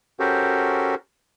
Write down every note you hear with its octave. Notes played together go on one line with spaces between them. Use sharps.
C#4 F#4 G4 A4 A#4 C5